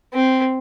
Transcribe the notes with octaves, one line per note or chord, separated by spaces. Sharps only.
C4